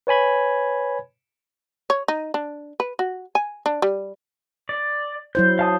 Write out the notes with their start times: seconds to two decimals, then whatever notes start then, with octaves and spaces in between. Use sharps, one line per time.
0.07 B4 C#5 G#5 B5 G#6
1.90 C#5
2.08 D#4
2.34 D4
2.80 B4
2.99 F#4
3.35 G#5
3.66 D4
3.82 G3
4.69 D5
5.35 F#3 E4 C5 G6
5.59 F5 A5 D#6